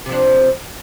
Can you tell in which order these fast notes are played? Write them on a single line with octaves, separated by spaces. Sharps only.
C3 F3 D4